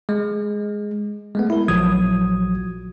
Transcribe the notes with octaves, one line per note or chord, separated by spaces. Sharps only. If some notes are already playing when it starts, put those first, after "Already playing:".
G#3
G#3 A3 B3
E4 A#4
A#1 F3 F#3 F#4 D#6 G#6